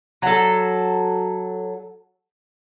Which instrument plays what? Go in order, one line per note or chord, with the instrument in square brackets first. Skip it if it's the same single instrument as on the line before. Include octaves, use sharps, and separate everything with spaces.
[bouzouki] F#3 A4